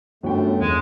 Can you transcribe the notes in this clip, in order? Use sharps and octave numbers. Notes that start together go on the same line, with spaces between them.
G1 F#2 A3 D4 F#4 G5
E2 G#3